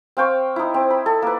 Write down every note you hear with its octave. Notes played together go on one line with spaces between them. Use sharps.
C4 F5 G5 C#6
D#4 E4
C4
B5
A4
A#3 B4